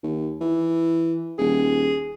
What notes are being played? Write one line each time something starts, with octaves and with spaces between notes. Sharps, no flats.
D#2
E3
D#1 G#4